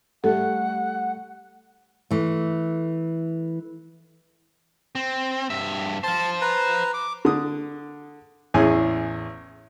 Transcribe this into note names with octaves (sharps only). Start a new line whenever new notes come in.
G3 A3 A4 F#5
E3 A3
C4
G2 E5
C5 F5 A5
B4 A#5
D6
D3 D#6
A1 E2 C#4 G#4 G#5